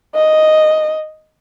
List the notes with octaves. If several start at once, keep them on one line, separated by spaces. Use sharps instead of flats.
D#5